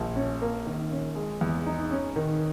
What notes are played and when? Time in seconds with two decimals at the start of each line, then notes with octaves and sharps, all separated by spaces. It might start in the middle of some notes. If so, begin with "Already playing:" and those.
Already playing: A#1 A#3
0.16 C#4
0.42 A#3
0.67 D#3
0.91 C#4
1.15 G#3
1.41 E2
1.66 D#4
1.91 C#4
2.16 D#3